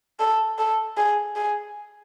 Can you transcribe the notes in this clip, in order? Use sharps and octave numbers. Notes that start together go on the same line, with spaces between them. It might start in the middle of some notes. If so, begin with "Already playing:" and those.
A4
A4
G#4
G#4